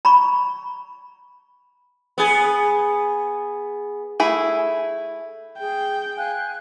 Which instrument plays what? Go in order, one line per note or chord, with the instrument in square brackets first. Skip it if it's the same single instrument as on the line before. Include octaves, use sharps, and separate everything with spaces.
[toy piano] A#5 B5 C#6
[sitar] B3 G#4
[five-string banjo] A3 E4 G#4
[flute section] G#4 [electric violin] G5
[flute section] F5 G#5 F#6